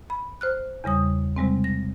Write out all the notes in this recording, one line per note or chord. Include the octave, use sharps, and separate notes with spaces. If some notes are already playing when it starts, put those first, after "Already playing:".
B5
C5 F6 F#6
E2 C#3 G3 D#6
C3 G3 G#3 C4
A#6